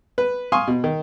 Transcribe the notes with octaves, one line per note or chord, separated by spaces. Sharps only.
B4
F5 G#5 C6 C#6 D#6
B2
D#3